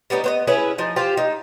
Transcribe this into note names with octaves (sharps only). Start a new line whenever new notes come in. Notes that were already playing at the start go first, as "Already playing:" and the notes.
G3 B3 C#4 D#4
B3 C5 D#5
C#4 E4 G#4 B4
F3 D#4
F4 G4 C5
D#4